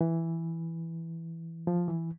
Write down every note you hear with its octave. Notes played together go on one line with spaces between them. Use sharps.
E3
F3
E3